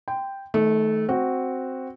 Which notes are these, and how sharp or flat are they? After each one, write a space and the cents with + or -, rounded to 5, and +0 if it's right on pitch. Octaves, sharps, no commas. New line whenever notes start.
G5 +0 C6 -30
D#3 +20 A3 -20
C4 +0 F#4 +0